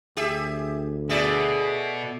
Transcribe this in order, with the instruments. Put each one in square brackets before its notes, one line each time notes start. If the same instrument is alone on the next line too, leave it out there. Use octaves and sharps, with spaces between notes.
[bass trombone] D2 [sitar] G4 G#4 E5
[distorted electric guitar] B2 [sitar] A3 D5 E5 [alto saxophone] G#4